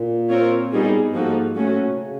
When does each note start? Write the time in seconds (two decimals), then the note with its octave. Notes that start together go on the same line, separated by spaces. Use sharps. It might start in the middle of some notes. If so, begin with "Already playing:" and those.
Already playing: A#2
0.30 C4 F4 A#4 C#5
0.72 A2 G3 B3 D#4 G#4
0.86 G2
0.99 G2
1.13 G#2 F3 A#3 D#4 F#4 A4
1.56 G#2 F#3 A3 C#4 F#4
1.67 A2
1.77 A#2
1.87 C3
1.98 C#3